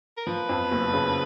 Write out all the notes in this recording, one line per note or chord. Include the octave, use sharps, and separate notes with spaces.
A#4
F3 B4
F2
F#1
C#3